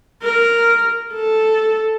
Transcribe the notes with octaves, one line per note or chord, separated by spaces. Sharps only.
A#4
A4